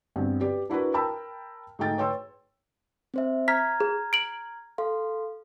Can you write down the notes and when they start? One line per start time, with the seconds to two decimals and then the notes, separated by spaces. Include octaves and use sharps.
0.16 G2 B3 C4
0.41 G4 B4 D5
0.70 D4 E4 F#4 A#4 B4
0.94 A#4 G5 A5 B5 E6
1.79 G#2 A3 D#4 G5 A6
1.98 B4 C#5 G5 C6 E6
3.14 C4 C5 E5
3.48 A#5 F6 G#6 B6
3.80 G#4
4.13 D7 F#7
4.78 A4 F5 C6